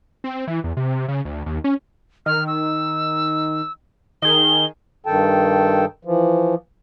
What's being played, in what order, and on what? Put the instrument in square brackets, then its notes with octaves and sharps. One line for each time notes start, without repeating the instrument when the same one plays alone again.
[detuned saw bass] C4
E3
E2
C3
C#3
D2
D#2
C#4
[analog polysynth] D#3 [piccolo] F6
[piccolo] E6
[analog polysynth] D#3 G#4 [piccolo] G7
[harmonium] G2 D#3 A4 G5 A5
E3 F3